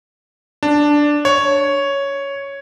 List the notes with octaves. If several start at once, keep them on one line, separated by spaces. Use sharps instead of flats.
D4
C#5